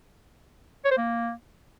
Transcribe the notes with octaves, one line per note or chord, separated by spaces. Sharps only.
C#5
C5
A#3